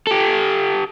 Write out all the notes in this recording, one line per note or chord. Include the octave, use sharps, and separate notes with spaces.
G4 A4